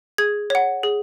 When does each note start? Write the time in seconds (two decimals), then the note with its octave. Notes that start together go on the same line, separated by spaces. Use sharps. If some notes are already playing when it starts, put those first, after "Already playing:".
0.18 G#4 G#6
0.50 C#5 F#5
0.83 G#4